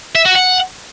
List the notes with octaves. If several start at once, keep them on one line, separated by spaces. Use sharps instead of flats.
E5
F#4
F#5